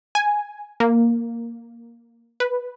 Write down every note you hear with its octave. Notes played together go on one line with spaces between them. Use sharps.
G#5
A#3
B4